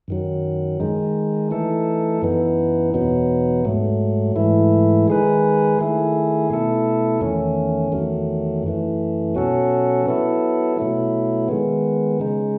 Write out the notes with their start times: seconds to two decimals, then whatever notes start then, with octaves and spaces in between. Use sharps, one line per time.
0.08 F#2 D#3 F#3
0.80 D#3 G#3 D#4
1.51 E3 A3 D#4 A4
2.22 F#2 E3 B3 D#4
2.94 E2 B2 F#3 B3 D#4
3.65 G#2 F#3 A3
4.36 G#2 E3 A3 E4
5.08 D#3 G#3 D#4 G#4 B4
5.79 D#3 A3 E4 G#4
6.50 B2 A3 E4 A4
7.21 E2 D#3 A3 C#4
7.92 E2 D#3 F#3 A3
8.63 F#2 E3 A3
9.35 B2 F#3 C#4 F#4 A4
10.06 F#3 B3 E4 A4
10.77 B2 F#3 A3 E4
11.49 D#3 G#3 B3
12.20 C#3 G#3 D#4